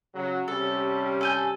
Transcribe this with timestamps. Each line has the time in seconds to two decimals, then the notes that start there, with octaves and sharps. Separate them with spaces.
0.14 C#3 F#3
0.48 C3 G3 C#4 A4
1.21 A4 G#5 G6